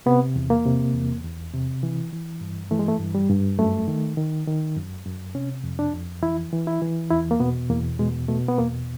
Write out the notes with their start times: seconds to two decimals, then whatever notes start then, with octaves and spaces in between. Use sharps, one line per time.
0.06 C3 B3
0.36 E2
0.50 A#3
0.65 C3
0.94 E2
1.24 E2
1.54 C3
1.83 E3
2.12 E3
2.41 G2
2.71 E3 A3
2.79 G#3
2.88 A3
3.00 G2
3.15 G3
3.29 G2
3.58 F#2 A3
3.88 D#3
4.17 D#3
4.47 D#3
4.77 F#2
5.06 F#2
5.35 C3 C#4
5.64 F2
5.79 D4
5.94 F2
6.22 E3 E4
6.53 E3
6.67 E4
6.82 E3
7.11 E2 E4
7.31 A#3
7.40 B2 B3
7.70 E2 A#3
7.99 B2 G#3
8.28 B2 A3
8.48 B3
8.58 E2 A#3